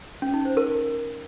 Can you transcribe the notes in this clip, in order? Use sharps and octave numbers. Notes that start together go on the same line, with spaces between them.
C#4
D#4
C5
A#4